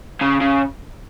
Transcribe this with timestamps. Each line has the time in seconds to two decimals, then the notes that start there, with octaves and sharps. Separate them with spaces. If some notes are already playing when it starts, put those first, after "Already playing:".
0.21 C#3
0.41 C#3